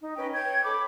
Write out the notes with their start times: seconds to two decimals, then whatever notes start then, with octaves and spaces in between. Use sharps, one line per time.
0.01 D#4
0.16 C#4 B4 D#5 G5
0.33 C#5 G5 G#6
0.64 A4 B5 D6